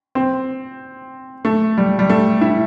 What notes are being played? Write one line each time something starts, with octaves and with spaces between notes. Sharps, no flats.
C4
A3
G3
G3
A3
E4